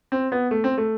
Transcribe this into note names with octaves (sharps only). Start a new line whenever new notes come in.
C4
B3
A3
C4
A3